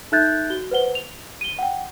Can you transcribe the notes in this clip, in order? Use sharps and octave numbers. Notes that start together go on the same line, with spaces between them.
D#4 A4 E5 F#6 G6 A6
F#4 G7
B4 C5 F#5 G7
F7
D#7 G7
F#5 G5